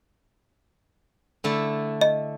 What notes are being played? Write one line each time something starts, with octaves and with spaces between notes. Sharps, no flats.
D3 A3 E4
D#5